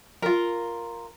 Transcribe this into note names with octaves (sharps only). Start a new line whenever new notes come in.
F4 A#4